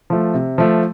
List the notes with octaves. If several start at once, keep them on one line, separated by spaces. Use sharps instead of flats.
F3 A3
C3
F3 A3